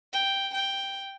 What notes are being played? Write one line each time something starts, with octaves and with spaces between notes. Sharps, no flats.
G5
G5